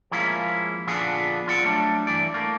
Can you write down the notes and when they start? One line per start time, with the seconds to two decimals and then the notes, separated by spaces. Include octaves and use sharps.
0.11 F3 G#3 A#3 C#4 E4 F4
0.87 A#2 D3 F3 B3 D4 G#4
1.48 F4 D5 F#5
1.63 F#3 G3 A3 D4
2.07 G2 E3 D5
2.34 A3 A#3